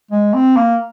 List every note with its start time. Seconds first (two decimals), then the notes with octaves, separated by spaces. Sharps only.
0.11 G#3
0.34 C4
0.56 A#3